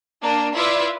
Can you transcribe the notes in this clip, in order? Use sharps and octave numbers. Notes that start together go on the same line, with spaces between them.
A#3 D4
E4 F4 B4 D5 E5